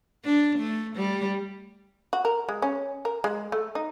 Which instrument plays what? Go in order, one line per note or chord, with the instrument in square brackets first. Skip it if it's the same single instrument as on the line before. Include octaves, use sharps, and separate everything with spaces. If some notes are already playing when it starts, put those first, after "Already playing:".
[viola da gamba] D4
A3
G3
[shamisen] F#4
A#4
G#3
C#4
A#4
G#3
A3
D#4